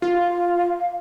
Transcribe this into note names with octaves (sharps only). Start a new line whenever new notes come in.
F4 F5